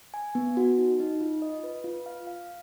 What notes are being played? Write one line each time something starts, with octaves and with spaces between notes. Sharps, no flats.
G#5
B3
F#4
D#4
D#4
F4
D#5
B4
F4
F5
F5